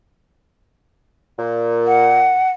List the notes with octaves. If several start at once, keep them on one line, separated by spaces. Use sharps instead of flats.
A#2
F#5